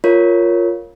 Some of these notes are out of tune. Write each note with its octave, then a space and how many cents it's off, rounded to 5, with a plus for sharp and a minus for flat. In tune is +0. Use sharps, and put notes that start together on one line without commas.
F4 +0 A#4 -5 C#5 +0